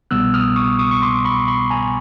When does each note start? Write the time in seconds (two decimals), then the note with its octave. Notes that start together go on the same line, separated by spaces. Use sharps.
0.11 C2 B2 G3 B3 E6 F#6
0.34 D#6 F6
0.56 C#6 D#6
0.79 C#6 D#6
0.91 C#6
1.02 C6 D6
1.25 B5 C#6
1.48 B5 C#6
1.70 G#5 A#5